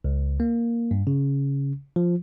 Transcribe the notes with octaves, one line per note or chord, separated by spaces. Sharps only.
C#2
A#3
G2
C#3
F3